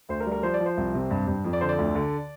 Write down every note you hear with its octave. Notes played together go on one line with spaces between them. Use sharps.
D2 C5
A#4
G3
A#4
F3 C5
D5
F3
C5
C2
C3
G2
G2
F2
D5
D3 C5
D5
D2
D3